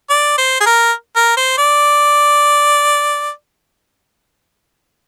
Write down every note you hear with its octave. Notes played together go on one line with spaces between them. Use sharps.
D5
C5
G#4
A#4
A#4
C5
D5